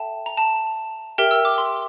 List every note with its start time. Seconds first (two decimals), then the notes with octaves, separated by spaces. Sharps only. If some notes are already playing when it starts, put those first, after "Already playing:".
Already playing: A4 E5 G5 A5
0.26 A#5
0.37 A5
1.18 G4 A#4 E5 G5 F6
1.31 E6
1.45 D6
1.58 C6